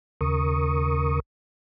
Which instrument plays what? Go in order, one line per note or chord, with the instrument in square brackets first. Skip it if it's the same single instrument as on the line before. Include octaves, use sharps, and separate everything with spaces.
[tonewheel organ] D#2 C#3 A#4 C#6 D#6